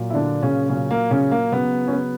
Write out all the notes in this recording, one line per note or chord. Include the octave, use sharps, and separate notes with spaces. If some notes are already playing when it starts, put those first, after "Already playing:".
Already playing: A#2 F#3
E4
D3 D4
C#3 C#4
A#2 C#3 F#3 C#4
A#3
C#3 C#4
A#3
C#3 F#3 B3
C#4
B3